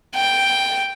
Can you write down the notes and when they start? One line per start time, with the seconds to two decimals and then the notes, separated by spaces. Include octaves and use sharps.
0.16 G5